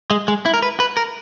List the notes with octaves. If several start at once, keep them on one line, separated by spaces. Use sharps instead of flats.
G#3
G#3
E4
A#4
B4
B4
A#4